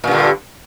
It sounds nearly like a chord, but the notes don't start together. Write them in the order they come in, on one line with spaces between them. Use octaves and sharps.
A#2 G2 D3